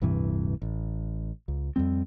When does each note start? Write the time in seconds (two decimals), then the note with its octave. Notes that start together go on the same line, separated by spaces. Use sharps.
0.02 D1 G2 C3 E3
0.62 A1
1.48 C#2
1.76 F2 G#2 G3 C4